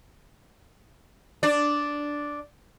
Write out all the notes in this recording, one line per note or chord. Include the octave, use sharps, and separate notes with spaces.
D4 D5